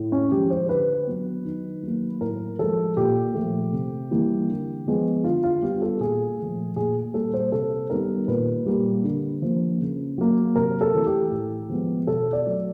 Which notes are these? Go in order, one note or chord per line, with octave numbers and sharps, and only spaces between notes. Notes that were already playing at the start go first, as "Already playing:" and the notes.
Already playing: A2
C#4
F3 G#3 G4
C5
D3 B4
F#3 B3
D#3
F#3 A#3
A2 A#4
F3 G#3 A4
A#2 G4
F3 A3
C3
E3 G3 A#3
D3
F3 G#3 B3
D3 F4
F4
G3 B3 G4
A4
A#2 G#4
F3 A3
A#2 G#4
G3 A#3 A4
C5
C3 A4
D#3 G3 B3 A#4
A#2 B4
G3 A#3
D3
F3 A#3
C#3
F#3 A#3
C3 A#4
A4
E3 A3
G4
A2
F3 G#3 B3
B2 A4
D5
F#3 A3